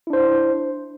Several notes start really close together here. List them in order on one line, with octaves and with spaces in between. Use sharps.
E4 D4 C5